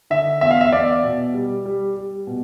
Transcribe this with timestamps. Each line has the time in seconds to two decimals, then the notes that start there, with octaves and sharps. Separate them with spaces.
0.10 D3 E5
0.41 E2 E5
0.51 F5
0.61 E5
0.72 E2 D5
1.04 B2
1.34 G3
1.65 G3
1.96 G3
2.27 B2